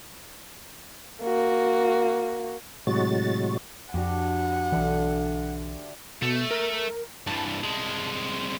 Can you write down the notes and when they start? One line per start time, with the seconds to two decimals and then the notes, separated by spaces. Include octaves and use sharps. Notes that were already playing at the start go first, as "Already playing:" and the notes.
1.23 A#3 F#4
2.87 A2 C3 F#3 G#3 F#4 A6
3.94 F2 D4 F#4 G4 F#5
4.72 B1 D3 E3 E5
6.22 B2 A3
6.51 A#4
7.27 G2 E3 A5
7.64 C2 G#3